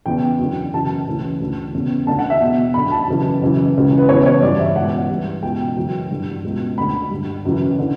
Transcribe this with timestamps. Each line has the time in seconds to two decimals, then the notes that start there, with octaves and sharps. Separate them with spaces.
0.06 E2 C#3 E3 G5
0.39 F#2 D3
0.74 F#2 C#3 E3 A5
1.07 D2 C#3 E3
1.40 D2 D3
1.74 E2 C#3 E3
2.07 D2 D3 A5
2.19 F#5
2.30 E5
2.41 E2 B2
2.74 F#2 D3 B5
2.92 A5
3.08 F#2 C#3 E3
3.41 F#2 C#3 E3
3.76 C#2 C#3 E3
3.98 B4
4.09 E2 C#3 E3 C#5
4.26 C#5
4.42 G2 E3 D5
4.60 E5
4.75 C#2 B2 F#5
5.10 G2 E3
5.43 C#2 B2 G5
5.76 F#2 C#3 E3
6.11 G2 D3
6.44 C#2 B2
6.78 D2 D3 B5
7.11 G2 D3
7.45 F#2 C#3 E3
7.79 D3